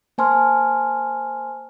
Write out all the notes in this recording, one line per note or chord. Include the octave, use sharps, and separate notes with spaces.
A#3 C5 G#5 A5 C6 F6